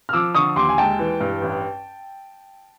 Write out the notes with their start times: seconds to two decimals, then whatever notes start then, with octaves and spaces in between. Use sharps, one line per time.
0.09 F6
0.13 F3 D6 E6
0.35 D3 C#6 D#6
0.56 D#2 C6 D6
0.69 G#5
0.78 G#3 G5 A5
0.99 E3
1.20 G2
1.42 A1